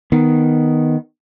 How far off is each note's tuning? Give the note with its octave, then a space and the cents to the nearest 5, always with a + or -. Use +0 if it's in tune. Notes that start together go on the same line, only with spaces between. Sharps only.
D#3 +0 B3 +0